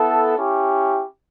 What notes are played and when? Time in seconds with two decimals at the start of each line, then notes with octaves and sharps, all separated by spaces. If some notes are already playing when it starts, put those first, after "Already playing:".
Already playing: B3 E4 A4
0.37 C#4 E4 G4